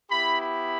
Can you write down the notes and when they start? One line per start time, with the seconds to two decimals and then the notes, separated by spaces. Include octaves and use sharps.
0.11 B3 E4 G4 B5
0.40 B5